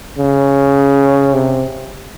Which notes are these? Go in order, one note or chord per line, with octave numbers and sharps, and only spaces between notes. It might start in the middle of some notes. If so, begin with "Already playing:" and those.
C#3
C3